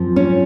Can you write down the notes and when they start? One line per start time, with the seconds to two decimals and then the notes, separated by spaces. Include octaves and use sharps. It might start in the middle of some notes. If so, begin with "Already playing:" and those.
Already playing: F#2 F3 C4
0.16 C#4